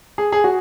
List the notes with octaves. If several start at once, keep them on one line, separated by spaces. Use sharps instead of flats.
G#4
G#4
F#4